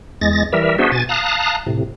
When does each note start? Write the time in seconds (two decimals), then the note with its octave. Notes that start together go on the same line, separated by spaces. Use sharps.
0.21 E2 G#3 A6 A#6
0.53 E3 G3 A#4 E5
0.78 B3 D4 F#4 G#4 C5 E5
0.92 B2 G#5 A6
1.09 F5 A5 A#5 D#6 F#6
1.66 A2 C3